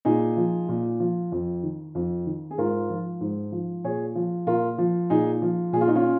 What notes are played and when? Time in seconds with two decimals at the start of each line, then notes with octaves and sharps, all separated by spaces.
0.05 A#2 D#4 G#4
0.37 F3
0.69 A#2
1.00 F3
1.32 F2
1.63 D#3
1.95 F2
2.26 D#3
2.51 G#4
2.58 G#2 F4 A#4
2.89 F3
3.21 G#2
3.52 F3
3.84 A#2 G#4 C#5
4.15 F3
4.47 A#2 F4 A#4
4.78 F3
5.10 A#2 D#4 G#4
5.42 F3
5.73 A#2 G#4
5.81 F4
5.88 D#4
5.96 C#4 F4